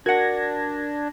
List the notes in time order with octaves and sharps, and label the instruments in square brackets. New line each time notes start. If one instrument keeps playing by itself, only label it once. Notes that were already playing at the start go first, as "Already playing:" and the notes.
[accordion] D4 [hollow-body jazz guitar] F#4 F#5 [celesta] A#4 [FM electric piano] G#6 A#6